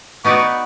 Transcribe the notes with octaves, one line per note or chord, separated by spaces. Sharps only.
B3 D#4 F#4 B4 D5 C#6